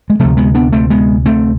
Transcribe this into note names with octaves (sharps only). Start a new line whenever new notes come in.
G#3
D2 C3 F3 A3
G#3 B3
B3 D4
A3 C4
G#3 B3
A3 C4